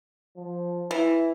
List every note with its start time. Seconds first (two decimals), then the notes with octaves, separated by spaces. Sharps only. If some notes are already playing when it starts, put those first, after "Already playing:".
0.37 F3
0.91 E3 E4